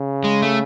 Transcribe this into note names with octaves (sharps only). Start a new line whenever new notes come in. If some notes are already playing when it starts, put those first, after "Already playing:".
Already playing: C#3
G#3
A3